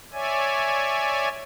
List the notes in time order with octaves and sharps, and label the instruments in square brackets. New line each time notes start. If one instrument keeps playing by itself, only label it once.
[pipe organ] C#5 D5 E5 G#5